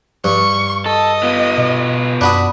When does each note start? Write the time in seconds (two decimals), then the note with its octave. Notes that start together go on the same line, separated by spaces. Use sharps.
0.24 G2 C#6
0.86 A4 D#5
1.23 B3 F4
1.58 B2
2.21 F#2 D4 F#4 B5 D#6